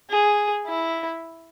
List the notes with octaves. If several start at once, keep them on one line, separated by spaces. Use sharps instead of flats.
G#4
E4